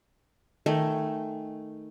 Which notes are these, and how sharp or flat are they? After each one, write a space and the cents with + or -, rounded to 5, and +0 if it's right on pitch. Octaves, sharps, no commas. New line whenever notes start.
D#3 +0 A3 +5 G#5 +0